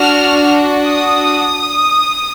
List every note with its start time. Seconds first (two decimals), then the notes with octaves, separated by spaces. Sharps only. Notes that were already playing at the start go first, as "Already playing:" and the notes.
Already playing: D4 F#4 F6
0.86 D#6